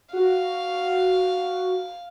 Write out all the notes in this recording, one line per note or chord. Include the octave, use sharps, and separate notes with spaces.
F#4 F5